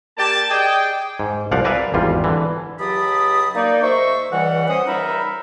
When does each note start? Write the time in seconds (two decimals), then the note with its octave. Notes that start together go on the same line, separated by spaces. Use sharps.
0.18 A#3 G4 D5 A5
0.50 G#4 D5 D#5 G5
1.20 G#2
1.51 C2 F3 D5 F5 F#5
1.65 A#4 B4 D5 E5 F5 G#5
1.94 G#1 E2 G3 F4
2.24 D3 E3
2.78 C#2 F#3 G4 A5 B5 D#6
3.55 A#3 D#4 D5
3.82 G#2 C5 E5 C#6
4.32 C#2 E3 G3 F#5
4.68 C#4 C5 F#5 D#6
4.87 C#2 G3 D#4 A#4 E5 B5